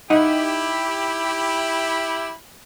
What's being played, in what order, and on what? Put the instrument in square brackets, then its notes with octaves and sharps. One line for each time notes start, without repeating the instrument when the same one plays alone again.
[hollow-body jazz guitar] D#4 D#5 F#5 [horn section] E4 G4